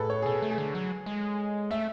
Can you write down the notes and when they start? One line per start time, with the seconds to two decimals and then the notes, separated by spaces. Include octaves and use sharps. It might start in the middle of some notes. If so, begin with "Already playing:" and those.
Already playing: A2 G#4 A4 B4
0.10 C#5
0.22 G#4
0.26 B2 A4
0.42 A3
0.51 G#4
0.58 D3
0.75 F#3
1.06 G#3
1.71 A3 E5